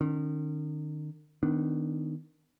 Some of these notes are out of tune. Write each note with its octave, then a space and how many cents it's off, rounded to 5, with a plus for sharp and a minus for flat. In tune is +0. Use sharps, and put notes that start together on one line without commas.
D#3 -35 C#4 -15
D#3 +0 B3 +30 D4 +0